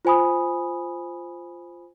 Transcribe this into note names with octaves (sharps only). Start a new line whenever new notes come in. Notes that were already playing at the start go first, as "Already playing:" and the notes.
F4 C5 G#5 B5 D#6